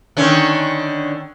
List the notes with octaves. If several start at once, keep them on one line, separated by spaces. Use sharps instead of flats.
D3 D#3 C#4